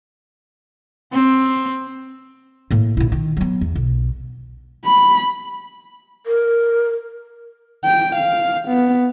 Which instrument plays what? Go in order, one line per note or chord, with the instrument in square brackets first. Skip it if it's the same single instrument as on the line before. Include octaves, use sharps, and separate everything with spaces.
[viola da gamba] C4
[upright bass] A2 A#3
A#1 E4
D#3
F#3 B3
E2
B1
[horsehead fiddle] B5
[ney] A#4
[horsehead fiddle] G5
F5
B3